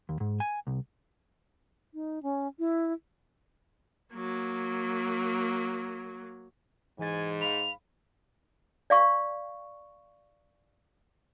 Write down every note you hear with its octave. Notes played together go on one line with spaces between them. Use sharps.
D#2
G#2
G#5
C2
D#4
C#4
E4
F#3 A#3
G#2 E3 G#5 A6
F5 B5 F7
D5 F5 C#6